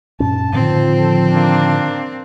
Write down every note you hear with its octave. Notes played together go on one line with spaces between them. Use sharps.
F#2 A#2 C#4 A5
A2 D3 D#3 F3 C4
A4
A#3 D4